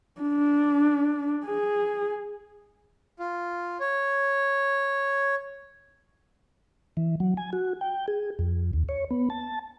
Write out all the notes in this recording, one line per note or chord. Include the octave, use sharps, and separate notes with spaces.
D4
G#4
F4
C#5
E3
F#3
G#5
F#4
G5
G#4
F2
D#2
C#5
B3
A5